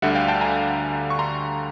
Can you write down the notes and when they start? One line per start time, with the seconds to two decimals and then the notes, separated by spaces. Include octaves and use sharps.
0.02 D2 D3 G3 E5 F#5
0.15 F5 G5
0.28 G5 A5
0.41 G#5 A#5
1.10 C#6
1.19 A#5 C6